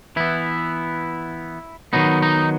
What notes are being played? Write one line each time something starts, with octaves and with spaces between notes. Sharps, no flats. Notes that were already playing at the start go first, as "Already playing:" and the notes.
E3 B3 E4
D#3 F#3 B3 D#4
D#4